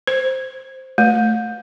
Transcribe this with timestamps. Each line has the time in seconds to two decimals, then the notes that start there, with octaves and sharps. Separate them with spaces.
0.07 C5
0.98 A3